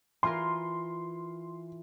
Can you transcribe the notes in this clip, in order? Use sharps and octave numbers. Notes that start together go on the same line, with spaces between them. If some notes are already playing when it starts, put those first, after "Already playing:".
E3 F4 A#4 C6